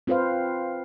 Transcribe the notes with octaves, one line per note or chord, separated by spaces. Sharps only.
C4 F4 B4 C5 F5